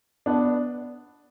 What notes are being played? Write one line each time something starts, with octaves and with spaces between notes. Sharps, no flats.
B3 D4